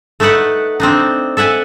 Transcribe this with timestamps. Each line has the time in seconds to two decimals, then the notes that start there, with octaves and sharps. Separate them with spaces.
0.20 A3 D#4 A4 B4 F#5
0.80 C4 D4 D#4
1.37 A4 E5 F#5 G#5